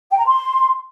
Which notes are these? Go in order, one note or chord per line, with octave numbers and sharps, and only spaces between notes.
G5
A#5
C6